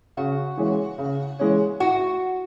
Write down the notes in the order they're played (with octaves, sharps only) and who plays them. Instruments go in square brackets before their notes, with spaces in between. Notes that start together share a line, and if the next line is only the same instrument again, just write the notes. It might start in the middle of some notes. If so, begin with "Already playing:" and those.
[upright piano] C#3 [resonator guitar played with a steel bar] F#4
[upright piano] E3 G#3 C#4
C#3
E3 G#3 C#4
[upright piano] A2 [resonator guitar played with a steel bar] F#4